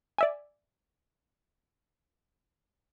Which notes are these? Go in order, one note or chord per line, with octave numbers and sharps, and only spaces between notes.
D5 E5 G#5